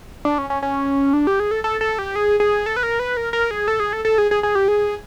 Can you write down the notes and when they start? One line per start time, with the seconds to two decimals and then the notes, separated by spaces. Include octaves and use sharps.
0.25 D4
0.38 C#4
0.50 C#4
0.63 C#4
1.13 D4
1.27 G4
1.40 G#4
1.51 A4
1.64 A4
1.81 A4
1.99 G4
2.16 G#4
2.40 G#4
2.66 A4
2.76 B4
2.83 A#4
2.99 B4
3.17 A#4
3.33 A#4
3.51 G#4
3.68 A4
3.80 G#4
3.93 A4
4.05 A4
4.18 G#4
4.31 G#4
4.43 G#4
4.55 G4
4.68 G#4